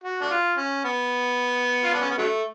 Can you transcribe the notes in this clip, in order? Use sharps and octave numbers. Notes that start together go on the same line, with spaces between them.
F#4
D4
F4
C#4
B3
F4
D4
C#4
B3
D3 F#3 A3